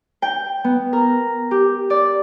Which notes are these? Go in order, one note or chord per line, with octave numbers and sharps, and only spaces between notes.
G5
B3
A#4
G4
D5